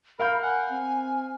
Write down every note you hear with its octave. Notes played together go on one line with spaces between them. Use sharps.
A#4 F5 B5 F6 G6
F#5 G#5
C4